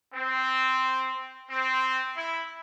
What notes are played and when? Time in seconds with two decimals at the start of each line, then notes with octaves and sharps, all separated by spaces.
0.14 C4
1.50 C4
2.17 E4